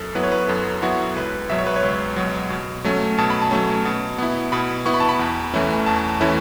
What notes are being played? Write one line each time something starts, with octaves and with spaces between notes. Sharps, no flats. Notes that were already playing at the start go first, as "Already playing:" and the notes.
Already playing: F#2 A4
F#3 B3 E4 B4
C#5
B4
F#2 A4
F#3 B3 E4 F#4
C#2 B4
B2 F#3 E5
C#5
B4
C#5
C#2
B2 F#3
B2
F#3 A3 C#4
B2 A5
B5
A5
F#3 A3 C#4
B2
B3 E4
B2 B5
B3 E4 C#6
B5
A5
B5
E2
E3 A3 C#4 E4
E2 A5
E3 A3 C#4 E4 E5